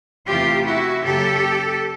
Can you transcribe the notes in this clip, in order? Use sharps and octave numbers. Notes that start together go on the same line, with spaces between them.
E2 C3 E3 A3 F4 G4
E4 F#4
F#2 C#3 F#3 A#3 G4 A4